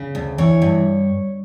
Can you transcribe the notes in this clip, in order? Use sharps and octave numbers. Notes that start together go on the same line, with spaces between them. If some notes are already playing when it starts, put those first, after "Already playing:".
Already playing: C#3
D2
E3 C#5
G2